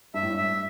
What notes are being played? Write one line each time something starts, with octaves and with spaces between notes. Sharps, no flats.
G2 E5
A2
G2
E5